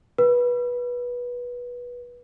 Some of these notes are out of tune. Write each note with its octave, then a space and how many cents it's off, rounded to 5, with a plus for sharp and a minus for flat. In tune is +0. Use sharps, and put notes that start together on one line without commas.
B4 -20